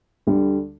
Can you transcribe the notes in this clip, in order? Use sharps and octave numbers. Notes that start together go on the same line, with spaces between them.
D2 D3 G3